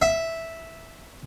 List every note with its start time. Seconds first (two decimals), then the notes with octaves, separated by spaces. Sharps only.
0.02 E5